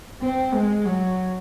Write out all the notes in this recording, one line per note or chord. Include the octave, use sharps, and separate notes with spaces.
C4
G#3
F#3